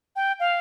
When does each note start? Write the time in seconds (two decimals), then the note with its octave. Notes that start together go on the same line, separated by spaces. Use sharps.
0.16 G5
0.40 F5